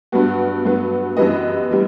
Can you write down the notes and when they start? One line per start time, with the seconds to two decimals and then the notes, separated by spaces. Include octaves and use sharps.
0.12 G2 F#3 B3 F#4
0.64 G2 F#3 B3
1.17 F#2 E3 G3 B3 B4 D#5
1.71 E3 G3